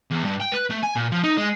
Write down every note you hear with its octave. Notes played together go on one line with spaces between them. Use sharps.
E2
G2
G5
B4
A3
G#5
A#2
F3
D#4
G#3